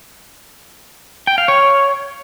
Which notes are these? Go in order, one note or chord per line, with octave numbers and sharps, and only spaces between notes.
G5
F5
C#5